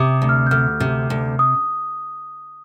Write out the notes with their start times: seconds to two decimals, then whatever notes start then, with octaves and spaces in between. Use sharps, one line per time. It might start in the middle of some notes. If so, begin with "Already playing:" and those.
Already playing: C3 D6 D#6
0.22 D2
0.29 F6
0.47 G6
0.51 D2 F6
0.80 C3
1.10 D2
1.39 D#6